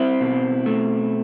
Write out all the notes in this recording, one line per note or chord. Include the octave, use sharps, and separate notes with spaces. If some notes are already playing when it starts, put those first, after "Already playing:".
Already playing: C4 E4
B2
A3